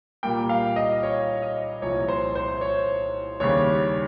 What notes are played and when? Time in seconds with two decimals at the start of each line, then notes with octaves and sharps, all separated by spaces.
0.23 A#2 G3 A#3 G5
0.49 F5
0.76 D#5
1.03 C#5
1.42 D#5
1.82 C2 A#2 F3 C#5
2.08 C5
2.35 C5
2.61 C#5
3.40 D#2 C#3 G3 C#5